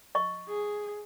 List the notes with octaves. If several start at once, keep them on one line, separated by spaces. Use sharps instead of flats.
D#5 C#6
G#4